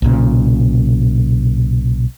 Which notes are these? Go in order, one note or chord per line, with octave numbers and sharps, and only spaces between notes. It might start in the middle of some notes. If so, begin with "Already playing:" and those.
B1 A#2 C#3